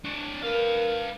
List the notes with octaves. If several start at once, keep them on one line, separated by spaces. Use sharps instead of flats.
D4 C#5
A#4 B4 F5